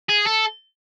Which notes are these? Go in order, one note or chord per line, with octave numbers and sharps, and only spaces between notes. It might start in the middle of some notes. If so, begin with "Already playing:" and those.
G#4
A4